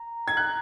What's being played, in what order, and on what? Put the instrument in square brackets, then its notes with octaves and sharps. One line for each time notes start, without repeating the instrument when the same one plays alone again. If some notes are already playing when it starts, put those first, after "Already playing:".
Already playing: [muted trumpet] A#5
[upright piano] G#6
F#6